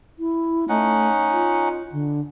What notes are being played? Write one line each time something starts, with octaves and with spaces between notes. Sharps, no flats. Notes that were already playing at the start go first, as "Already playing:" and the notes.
E4
A3 C#4 D#4 F#5
F4
D3